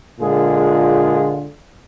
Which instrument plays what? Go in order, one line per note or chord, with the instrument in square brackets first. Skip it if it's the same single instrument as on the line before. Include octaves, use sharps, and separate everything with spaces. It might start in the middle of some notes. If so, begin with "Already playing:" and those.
[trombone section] A#2 D3 G#3 F4 G#4